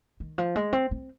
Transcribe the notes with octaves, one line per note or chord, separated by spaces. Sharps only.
D#3
F3
G#3
C4
C4